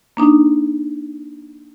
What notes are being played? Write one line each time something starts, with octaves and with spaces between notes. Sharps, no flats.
A#3 D4 D#4